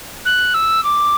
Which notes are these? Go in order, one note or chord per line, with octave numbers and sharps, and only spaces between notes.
F#6
E6
D6